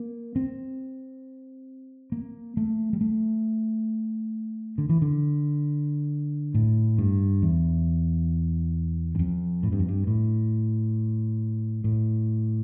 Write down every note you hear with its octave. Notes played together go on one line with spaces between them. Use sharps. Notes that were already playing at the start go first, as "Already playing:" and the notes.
Already playing: A#3
C4
A#3
A3
G3
A3
D3
E3
D3
A2
G2
E2
G2
F2
A2
G2
F2
G2
A2
A2